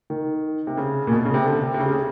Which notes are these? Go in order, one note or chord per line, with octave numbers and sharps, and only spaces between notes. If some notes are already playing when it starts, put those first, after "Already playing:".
D#3
C3
C#3
A#2
B2
C#3
C3
D3
C3
C3
C#3
C3
C#3